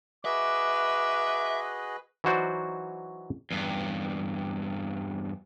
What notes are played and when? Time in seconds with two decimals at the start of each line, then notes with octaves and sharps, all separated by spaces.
0.25 F#4 G#4 B4 D#5 E5 D6
2.24 E3 F#3 D#4 F#4 C5 D5
3.51 E2 G2